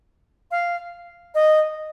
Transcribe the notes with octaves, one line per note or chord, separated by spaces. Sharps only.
F5
D#5